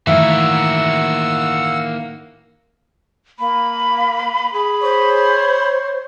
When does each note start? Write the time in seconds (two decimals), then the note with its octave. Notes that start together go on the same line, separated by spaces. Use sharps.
0.07 A2 D#3 E3 A#3 F#4 E5 F#5 E6
3.39 A#3 B5
4.54 G#4 B5
4.82 C5 C#5